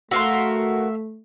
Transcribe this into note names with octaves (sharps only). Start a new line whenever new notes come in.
A3 F#4 A#4 E5 F5 C6